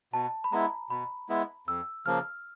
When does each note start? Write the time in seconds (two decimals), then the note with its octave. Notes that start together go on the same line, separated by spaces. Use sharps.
0.13 B2 A5
0.44 B5
0.52 G#3 B3 E4 A#5
0.90 B2 B5
1.29 G#3 B3 E4
1.67 F2 E6
2.06 C#3 F3 A#3 F6